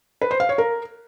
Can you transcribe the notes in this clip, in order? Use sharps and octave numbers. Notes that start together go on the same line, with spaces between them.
B4
C5
F5
C#5
A#4